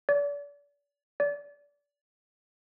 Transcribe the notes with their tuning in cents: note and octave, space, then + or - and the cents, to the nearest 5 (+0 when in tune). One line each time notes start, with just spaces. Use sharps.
D5 -35
D5 -25